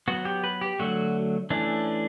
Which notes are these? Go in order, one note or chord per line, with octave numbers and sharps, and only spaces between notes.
F#3 B3 F#4
G4
B4
G4
D3 F#3 A3 F#4
E3 A3 C#4 D4